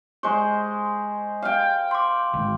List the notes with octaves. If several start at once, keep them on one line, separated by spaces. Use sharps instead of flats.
G#3 C5 C#6
F5 G5
C6 D6
G#1